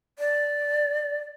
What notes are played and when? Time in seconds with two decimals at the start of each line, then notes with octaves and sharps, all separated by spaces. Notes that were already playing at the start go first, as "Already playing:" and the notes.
0.19 D5